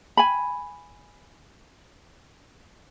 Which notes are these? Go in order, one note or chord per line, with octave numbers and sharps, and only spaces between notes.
G#5 B5